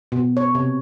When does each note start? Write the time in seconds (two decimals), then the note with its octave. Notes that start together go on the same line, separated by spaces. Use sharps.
0.12 B2
0.37 C#5
0.55 C3